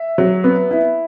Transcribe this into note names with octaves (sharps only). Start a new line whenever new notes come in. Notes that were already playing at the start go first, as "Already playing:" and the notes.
Already playing: E5
F#3
B3
E4